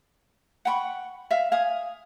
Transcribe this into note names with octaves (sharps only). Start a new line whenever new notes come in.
F#5 G5 B5 C#6
E5 F5
F5 G#5 D#6